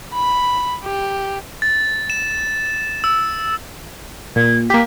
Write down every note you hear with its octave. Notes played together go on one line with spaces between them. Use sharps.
B5
G4
A6
E7
E6
A#2 G#6
A#3 G4 B6